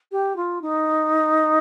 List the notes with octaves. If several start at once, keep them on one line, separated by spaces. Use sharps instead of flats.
G4
F4
D#4